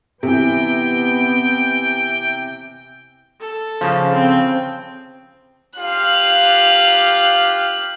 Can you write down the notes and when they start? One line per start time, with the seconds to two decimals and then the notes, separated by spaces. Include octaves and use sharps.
0.23 C3 E3 B3 G5
3.40 A4
3.81 C#3 F3
4.13 C4 G5
5.78 F4 G4 F5 F#6